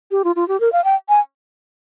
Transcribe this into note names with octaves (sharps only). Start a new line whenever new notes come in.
G4
F4
F4
G4
A#4
F5
G5
G#5